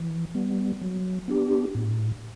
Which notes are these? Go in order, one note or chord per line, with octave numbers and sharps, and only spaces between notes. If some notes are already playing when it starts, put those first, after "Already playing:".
Already playing: E3
G3 B3
F#3
B3 D4 G4
A2